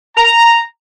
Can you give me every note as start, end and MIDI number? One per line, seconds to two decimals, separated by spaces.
0.17 0.60 82